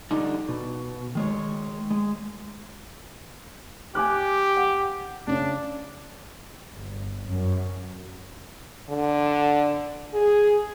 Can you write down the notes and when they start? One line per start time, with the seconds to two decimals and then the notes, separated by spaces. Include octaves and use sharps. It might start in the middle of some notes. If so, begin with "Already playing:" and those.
0.11 D3 G3 D#4
0.48 B2
1.15 D#3 G#3 C#5
1.90 G#3
3.95 G4 G#5 D6 F#6
4.57 F#5
5.27 C#3 C#4 D4
6.74 G1
7.27 F#2
8.90 D3
10.14 G#4